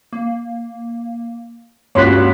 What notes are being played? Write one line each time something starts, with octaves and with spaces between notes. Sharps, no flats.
A#3
C#2 G2 A#3 F#4 C#5 C6 F#6 B6